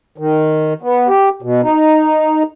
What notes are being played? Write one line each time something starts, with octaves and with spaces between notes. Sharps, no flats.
D#3
B3
G4
B2
D#4